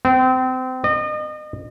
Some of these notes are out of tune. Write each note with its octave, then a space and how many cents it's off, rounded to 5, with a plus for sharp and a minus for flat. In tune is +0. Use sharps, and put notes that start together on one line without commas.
C4 -30
D#5 -35